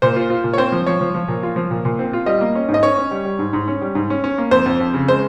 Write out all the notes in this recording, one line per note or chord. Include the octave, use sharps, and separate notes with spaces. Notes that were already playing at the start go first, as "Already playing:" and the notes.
A#2 C5
F4
F4
A#2
C#5
C4 C5
F3
F3 C#5
F3
F3
A#2
F4
F3
A#2
A#2
C4
F4
G3 D#5
A#3
C#4
G#2
D#5
C#4 C#5
C#4
G3
G3
G#2
G#2
C#4
G3
G#2
C#4
C#4
A#3
F2 C5
F2
F2
C#3
G#3 C5